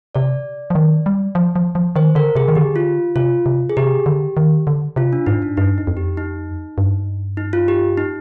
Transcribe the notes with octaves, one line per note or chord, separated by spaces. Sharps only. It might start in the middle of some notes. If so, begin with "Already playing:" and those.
C3 D5
F3
D#3
G3
F3
F3
F3
D#3 C5
D3 A#4
C3 G#4
D#3
D3 G4
F4
C3 F4
C3
G#4
C3 G4
D3
D#3
D3
C3 F4
D4
G#2 D#4
D4
G2 D#4
D#4
F2
G4
D#4
G2
D#4
F4
G4
D#4